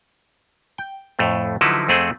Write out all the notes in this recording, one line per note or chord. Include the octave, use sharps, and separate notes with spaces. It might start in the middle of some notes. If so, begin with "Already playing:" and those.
G5
F2 A2 A3
D3 F3 F#3 D#4 E4 B4
F2 A3 C4 G#4 F#5